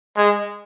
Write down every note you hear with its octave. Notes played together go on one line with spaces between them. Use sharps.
G#3